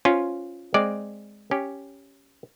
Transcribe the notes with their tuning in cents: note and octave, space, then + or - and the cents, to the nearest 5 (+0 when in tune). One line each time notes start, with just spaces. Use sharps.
C#4 +0 F4 +0 C5 +0
G#3 +0 C4 +0 D5 +0
C#4 +0 G4 +0